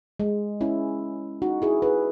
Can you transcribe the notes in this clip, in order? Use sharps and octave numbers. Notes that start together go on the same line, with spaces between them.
G#3
C#4 E4
D#4 F#4
E4 G#4
G#4 B4